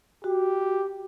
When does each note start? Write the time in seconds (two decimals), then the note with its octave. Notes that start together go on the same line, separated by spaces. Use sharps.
0.24 F#4 G4